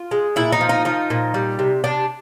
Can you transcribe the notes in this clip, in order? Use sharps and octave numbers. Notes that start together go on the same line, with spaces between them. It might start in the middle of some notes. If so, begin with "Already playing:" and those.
Already playing: F4
G#3
A#2 E4
D#4
F3
D#4
F3 D#4
A#2
G3
C3
C3 D4